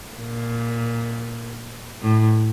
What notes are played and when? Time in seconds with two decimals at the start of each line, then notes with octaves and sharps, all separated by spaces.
0.17 A#2
2.02 A2